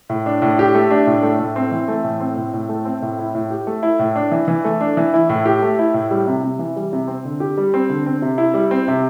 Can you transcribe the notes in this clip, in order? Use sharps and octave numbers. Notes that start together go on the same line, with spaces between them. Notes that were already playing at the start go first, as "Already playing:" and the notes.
A2
D4
A2
G4
A3
D4
A2
A3
A2
C4
E3
A3
A2
C4
A2
A2
A3
C4
A2
E4
A2
G4
A3
E4
A2
D4
E3
E3
A3
D4
E3
E4
A2
G4
A3
E4
A2
G3
C3
C3
E3
G3
C3
C4
D3
G4
G3
C4
D3
C4
C3
E4
G3
C4
C3